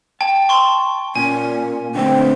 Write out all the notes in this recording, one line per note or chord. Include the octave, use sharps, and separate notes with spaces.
G5 A5
C6 C#6
A#2 C#4 G#5
D3 A3 C4 G5